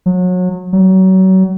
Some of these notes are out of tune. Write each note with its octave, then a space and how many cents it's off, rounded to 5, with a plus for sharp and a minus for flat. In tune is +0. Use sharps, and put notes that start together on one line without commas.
F#3 -30
F#3 +30